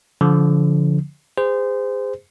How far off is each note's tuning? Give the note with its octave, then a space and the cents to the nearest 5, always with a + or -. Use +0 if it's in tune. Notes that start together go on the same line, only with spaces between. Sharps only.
D3 -35 F3 -10
G#4 -30 C5 -25